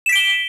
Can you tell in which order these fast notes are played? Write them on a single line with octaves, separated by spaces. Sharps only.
E7 B6 D7 G7